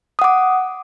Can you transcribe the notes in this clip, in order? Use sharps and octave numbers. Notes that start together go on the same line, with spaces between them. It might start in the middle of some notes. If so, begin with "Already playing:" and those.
F#5 D6 D#6